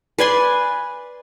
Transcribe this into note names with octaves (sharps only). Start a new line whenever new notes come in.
B4 D5 G#5 C6